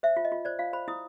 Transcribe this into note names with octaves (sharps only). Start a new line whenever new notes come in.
C5 E5
F4
D#5
F4
C5 D5
F4 F5
C5 B5
E4 D#6